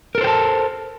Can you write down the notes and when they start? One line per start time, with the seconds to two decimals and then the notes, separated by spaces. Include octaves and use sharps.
0.15 A#4
0.18 A4
0.21 C5
0.24 G5
0.27 A5